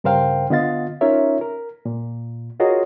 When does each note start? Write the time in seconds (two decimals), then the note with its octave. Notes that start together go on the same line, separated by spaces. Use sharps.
0.04 G2 C#3 A#4 C5 F5 G5
0.50 D3 B3 F4 D#5 F5 A6
1.01 C#4 D#4 F4 A#4 C#5 E5
1.41 A#4
1.85 A#2
2.60 F4 F#4 G#4 A#4 C#5 D#5